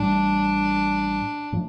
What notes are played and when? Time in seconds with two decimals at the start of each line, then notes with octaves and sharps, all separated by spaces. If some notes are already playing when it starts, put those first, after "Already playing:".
Already playing: A1 A2 G3 D4
1.52 A2 F3